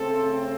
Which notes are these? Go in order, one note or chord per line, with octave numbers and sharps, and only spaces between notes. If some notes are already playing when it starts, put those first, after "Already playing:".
Already playing: C#3 A3 C4 A4